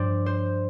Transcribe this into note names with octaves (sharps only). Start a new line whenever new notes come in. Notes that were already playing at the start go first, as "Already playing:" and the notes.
Already playing: G2 F3 C5 D5
C5